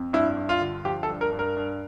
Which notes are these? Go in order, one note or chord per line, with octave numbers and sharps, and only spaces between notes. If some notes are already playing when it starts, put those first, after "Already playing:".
Already playing: F2
G2 E4
G2
F4
D3
F3 G4
A4
G2
A#4
G2
A#4
G2